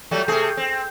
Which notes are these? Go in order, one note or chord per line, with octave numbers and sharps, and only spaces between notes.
F#3 G3 A3
C3 A3 G#4
C4